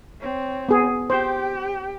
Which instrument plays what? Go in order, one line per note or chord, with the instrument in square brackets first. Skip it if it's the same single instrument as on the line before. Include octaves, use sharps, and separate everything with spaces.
[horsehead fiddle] C4 C#5
[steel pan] B3 G#4
[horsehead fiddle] G4 G5 [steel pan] C5